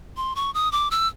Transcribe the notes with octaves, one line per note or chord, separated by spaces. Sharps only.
C6
C#6
D#6
D6
E6